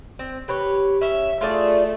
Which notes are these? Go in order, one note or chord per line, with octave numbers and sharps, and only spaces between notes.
C4
G4 B4 C#5
C#4 E5
A3 F4 G#4 D5